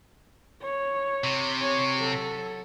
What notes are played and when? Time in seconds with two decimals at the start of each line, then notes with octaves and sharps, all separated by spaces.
0.62 C#5
1.24 C3
1.58 C#5 G#5
1.97 F#3 A4